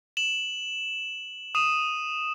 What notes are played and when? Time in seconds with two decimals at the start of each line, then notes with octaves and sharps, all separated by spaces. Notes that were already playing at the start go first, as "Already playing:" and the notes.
0.17 E7 F#7
1.55 D#6 D#7 E7